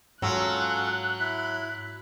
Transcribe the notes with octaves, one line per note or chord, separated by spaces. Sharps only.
G#2 F#3 C#4 F4 A4 F#6
E4 B5